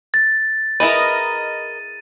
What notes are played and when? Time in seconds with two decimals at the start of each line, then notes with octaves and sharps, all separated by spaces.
0.14 A6
0.80 E4 G#4 A#4 B4 D#5 D#7